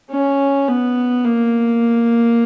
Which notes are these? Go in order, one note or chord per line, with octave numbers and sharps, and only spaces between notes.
C#4
B3
A#3